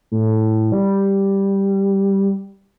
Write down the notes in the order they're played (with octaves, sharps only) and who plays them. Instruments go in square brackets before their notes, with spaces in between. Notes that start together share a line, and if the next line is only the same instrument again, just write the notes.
[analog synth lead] A2
G3